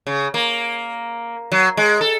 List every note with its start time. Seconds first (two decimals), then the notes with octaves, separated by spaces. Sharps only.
0.07 C#3
0.34 A#3
1.52 F#3
1.77 G#3
2.01 A4